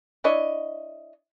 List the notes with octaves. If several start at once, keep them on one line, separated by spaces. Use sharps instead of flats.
D4 E4 C#5 D#5